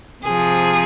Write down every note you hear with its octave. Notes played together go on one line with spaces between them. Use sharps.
C3 F3 G#4